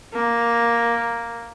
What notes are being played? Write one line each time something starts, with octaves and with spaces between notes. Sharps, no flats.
A#3